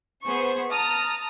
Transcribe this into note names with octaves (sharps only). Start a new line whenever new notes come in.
B3 G#4 C5 C#6
A5 A#5 D#6 F6